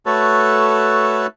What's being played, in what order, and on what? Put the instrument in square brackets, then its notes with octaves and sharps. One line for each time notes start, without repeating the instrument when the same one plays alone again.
[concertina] A3 F#4 A4 B4 C#5 A5